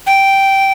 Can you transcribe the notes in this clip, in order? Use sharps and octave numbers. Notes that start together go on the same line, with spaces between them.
G5